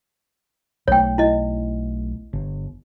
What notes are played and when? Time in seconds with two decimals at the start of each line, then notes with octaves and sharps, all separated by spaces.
0.88 B1 A3 C#5 G5
1.18 E4 D#5
2.33 G1